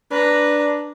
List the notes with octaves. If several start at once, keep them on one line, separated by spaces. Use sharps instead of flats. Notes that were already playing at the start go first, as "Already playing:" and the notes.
D4 B4 A#5